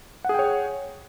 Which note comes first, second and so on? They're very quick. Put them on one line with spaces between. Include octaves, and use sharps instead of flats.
F#5 G#4 G5 C#5